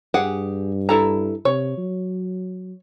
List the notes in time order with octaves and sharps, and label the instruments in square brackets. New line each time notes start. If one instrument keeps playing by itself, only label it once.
[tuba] G2 [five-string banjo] G4 G#4 F#5
[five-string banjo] E4 A4 A#5
[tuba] C3 [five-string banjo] C#5
[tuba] F#3